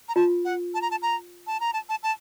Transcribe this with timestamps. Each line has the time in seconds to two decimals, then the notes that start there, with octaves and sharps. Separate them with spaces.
0.09 A#5
0.15 F4 A5
0.45 F#5
0.74 A5
0.82 A#5
0.91 A5
1.02 A#5
1.47 A5
1.60 A#5
1.73 A5
1.89 A5
2.03 A5